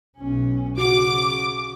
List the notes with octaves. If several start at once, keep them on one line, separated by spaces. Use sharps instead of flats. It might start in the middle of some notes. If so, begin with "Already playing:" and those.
B1 C#4
C#3 F#4 D6